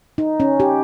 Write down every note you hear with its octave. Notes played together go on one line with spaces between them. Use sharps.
D#4
C#4
G4